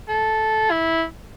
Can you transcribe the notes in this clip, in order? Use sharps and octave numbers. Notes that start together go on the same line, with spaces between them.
A4
E4